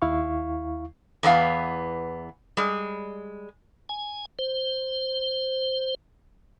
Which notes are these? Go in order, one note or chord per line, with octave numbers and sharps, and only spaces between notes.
D#2 E4 F5 C#6
E2 E3 B3 F5
G3 G#3
G#5
C5